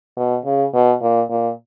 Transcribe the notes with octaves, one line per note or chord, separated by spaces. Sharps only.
B2
C#3
B2
A#2
A#2